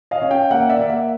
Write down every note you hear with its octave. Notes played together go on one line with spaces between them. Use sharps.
D#5 F5
C#4
F5 G5
A#3 E5 F#5
D5 E5
A#3
E5 F#5